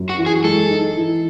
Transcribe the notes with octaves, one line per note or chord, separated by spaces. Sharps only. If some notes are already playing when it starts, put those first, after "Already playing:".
Already playing: F#2
F#4
E3
G#4
G#3 A4
D#4
E3